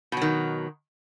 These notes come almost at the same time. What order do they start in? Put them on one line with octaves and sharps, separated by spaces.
B2 F#3 D#3